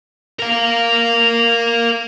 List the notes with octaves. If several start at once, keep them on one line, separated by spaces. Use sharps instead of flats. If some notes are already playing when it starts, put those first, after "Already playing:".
A#4 F5